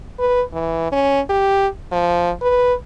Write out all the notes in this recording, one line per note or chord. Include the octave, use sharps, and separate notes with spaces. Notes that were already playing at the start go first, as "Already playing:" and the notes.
B4
E3
C#4
G4
F3
B4